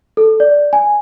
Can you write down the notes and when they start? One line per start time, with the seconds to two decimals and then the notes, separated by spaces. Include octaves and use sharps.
0.17 A4
0.40 D5
0.73 G#5